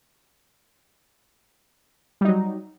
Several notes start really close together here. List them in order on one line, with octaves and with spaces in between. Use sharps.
G3 D#4 F#3